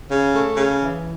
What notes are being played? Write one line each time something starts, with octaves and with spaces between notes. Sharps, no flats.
C#3
A3
C#3
E3